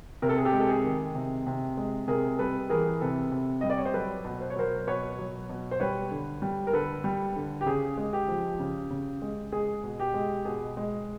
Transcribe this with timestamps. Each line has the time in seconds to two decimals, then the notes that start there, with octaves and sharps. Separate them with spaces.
0.22 C3 A#4
0.29 A4
0.38 G#4
0.45 G4 A4
0.53 G#3
0.60 A4
0.69 G#4
0.84 D#3
1.15 C3
1.47 C3
1.77 G#3
2.07 C3 G#4 A#4
2.39 G3 A4 B4
2.70 E3 G#4 A#4
3.01 C3 A4 B4
3.32 C3
3.61 G3 D#5
3.70 D5
3.78 C#5
3.85 C5
3.94 F#3 A4 B4
4.25 B2
4.41 C5
4.50 C#5
4.56 F#3 A#4 C5
4.87 B2 B4 C#5
5.18 F#3
5.49 B2
5.71 C5
5.80 G3 B4 C#5
6.11 D3
6.42 G3
6.67 A#4
6.73 D3 A4 B4
7.04 G3
7.36 D3
7.61 G4
7.66 C#3 G#4
7.97 G#3
8.13 G4
8.28 F3
8.59 C#3
8.90 C#3
9.22 G#3
9.52 G#3 G#4
9.84 B2
10.00 G4
10.14 G#3
10.45 B2 G#4
10.77 G#3